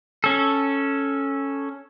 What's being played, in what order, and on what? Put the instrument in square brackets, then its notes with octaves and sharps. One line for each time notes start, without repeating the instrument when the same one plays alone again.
[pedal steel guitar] C#4 A4